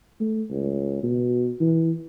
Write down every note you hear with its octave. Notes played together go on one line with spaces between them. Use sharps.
A3
C#2
B2
E3